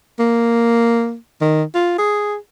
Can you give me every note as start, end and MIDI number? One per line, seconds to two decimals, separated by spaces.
0.19 1.16 58
1.41 1.63 51
1.74 1.97 65
1.98 2.35 68